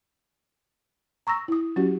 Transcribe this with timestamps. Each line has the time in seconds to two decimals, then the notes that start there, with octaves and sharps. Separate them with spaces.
1.27 A#5 C#6 E6 A#6
1.48 E4 D#6
1.76 F#3 C#4 F#4 G4